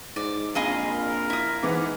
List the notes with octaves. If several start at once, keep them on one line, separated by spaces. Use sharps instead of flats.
G#2 D5
A#1 F2 G#4 D#5 F5 A#5 B5
A#4
E4 D#6
G#2 E3 B3 D6